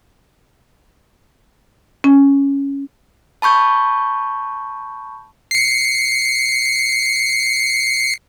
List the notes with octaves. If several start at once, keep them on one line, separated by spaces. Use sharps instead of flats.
C#4
A5 B5 C#6 G6
C7 C#7